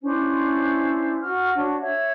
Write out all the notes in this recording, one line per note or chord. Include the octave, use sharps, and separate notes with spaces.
C#4 D4 E4 C5
F#4 C#6 F6
D4 F#4 C#5
C#5 E5